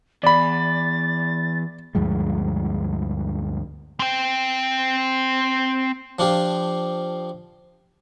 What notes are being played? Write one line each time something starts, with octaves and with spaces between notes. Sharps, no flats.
E2 D5 B5 A6
D2 G2 F3 G#3
C4 G5
F3 D4 F4 G4